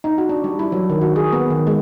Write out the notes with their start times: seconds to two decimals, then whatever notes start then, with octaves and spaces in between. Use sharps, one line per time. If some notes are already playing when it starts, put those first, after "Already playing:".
0.04 D#4
0.18 F#4
0.29 D4
0.44 G3
0.59 E4
0.72 F#3
0.90 D#3
1.01 F#4
1.16 G#4
1.33 B3
1.50 D#3
1.67 G#3